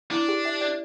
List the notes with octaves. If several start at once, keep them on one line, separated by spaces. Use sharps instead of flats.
D4 E4
G4
E5
D5